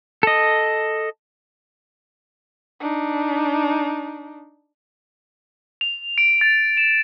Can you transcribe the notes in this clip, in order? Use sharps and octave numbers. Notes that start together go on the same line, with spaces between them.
A4 D#5
D4 D#4
F7
D7
A6
E7